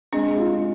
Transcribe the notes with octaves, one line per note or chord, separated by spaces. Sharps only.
G#3 C4 D4
F4